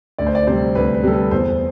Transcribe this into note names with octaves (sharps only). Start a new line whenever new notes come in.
D2 D5
C5
D5
C3 G3 C5
D2 B4
B4
C3 G3 A4
B4
E2 C5